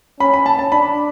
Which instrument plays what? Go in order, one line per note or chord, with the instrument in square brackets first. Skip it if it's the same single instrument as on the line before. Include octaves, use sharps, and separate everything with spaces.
[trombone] C#4 [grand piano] B5
[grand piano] B5
A5
A5
[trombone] D4 [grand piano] B5